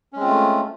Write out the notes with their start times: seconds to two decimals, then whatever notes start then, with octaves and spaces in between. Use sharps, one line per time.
0.13 C#4
0.16 G#3
0.20 C4
0.24 F4
0.27 A3